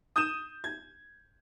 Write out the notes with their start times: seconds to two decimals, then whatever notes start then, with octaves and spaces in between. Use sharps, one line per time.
0.16 D#6 G6 D#7 E7
0.64 G#6